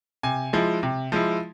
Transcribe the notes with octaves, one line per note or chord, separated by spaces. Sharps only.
C3 G#5
F3 G#3 E4
C3
F3 G#3 E4